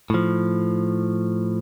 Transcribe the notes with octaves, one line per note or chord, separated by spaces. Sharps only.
A2 F3